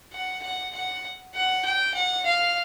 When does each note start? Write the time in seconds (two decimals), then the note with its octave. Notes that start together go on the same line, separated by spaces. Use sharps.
0.13 F#5
0.43 F#5
0.75 F#5
1.35 F#5
1.65 G5
1.95 F#5
2.26 F5